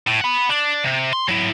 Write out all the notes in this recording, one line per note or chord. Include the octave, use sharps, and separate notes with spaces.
A2
F#5 B5
D4
C3
C6
F#3 E4